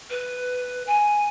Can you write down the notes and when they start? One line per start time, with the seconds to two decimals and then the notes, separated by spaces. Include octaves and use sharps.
0.10 B4
0.87 G#5